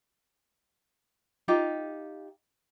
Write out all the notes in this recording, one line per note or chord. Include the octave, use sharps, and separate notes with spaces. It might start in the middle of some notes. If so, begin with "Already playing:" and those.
D#4 F4 G4